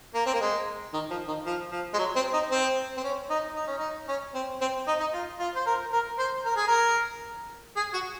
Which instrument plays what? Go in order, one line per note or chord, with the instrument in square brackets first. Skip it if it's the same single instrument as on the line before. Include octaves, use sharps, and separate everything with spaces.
[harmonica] A#3
C4
A#3
G#3
D#3
F3
D#3
F3
F3
G#3
F#3
C4
D#4
C4
C4
C#4
D#4
D#4
C#4
D#4
C#4
C4
C4
D#4
D#4
F4
F4
C5
A#4
A#4
C5
A#4
G#4
A#4
G#4
F#4